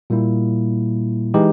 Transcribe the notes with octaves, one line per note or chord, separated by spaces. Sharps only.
A#2 G3 A#3 E4
E3 G#3 D#4 G4